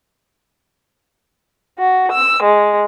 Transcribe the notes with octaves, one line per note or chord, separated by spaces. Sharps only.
F#4
E6
G#3